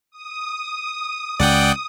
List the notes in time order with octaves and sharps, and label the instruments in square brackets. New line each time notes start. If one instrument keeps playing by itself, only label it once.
[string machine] D#6
[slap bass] C#2 [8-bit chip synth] D5 F#5 G5